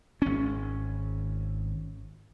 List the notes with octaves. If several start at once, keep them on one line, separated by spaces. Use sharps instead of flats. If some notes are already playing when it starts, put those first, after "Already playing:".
G#1 C#4